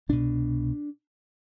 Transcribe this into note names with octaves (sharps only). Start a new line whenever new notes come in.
C2 B2 D4